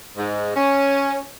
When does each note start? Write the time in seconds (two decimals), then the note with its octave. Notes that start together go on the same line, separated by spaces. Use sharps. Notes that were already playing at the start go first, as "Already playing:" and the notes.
0.17 G#2
0.56 C#4